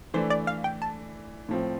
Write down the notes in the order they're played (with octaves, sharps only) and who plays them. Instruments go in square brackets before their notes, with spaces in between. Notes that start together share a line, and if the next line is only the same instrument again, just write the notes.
[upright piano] E3 A3 D4 [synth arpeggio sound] C5
[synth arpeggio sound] D5
F5
G5
A5
[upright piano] A2 F3 C4